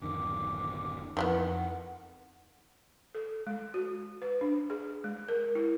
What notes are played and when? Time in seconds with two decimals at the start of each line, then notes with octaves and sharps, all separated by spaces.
0.02 D1 F#2 D#3 D6
1.17 F2 D#3 E3 B3 F#5
3.15 A4
3.47 G#3
3.74 F#4
4.22 B4
4.41 D4
4.70 G#4
5.04 G#3
5.28 A#4
5.55 E4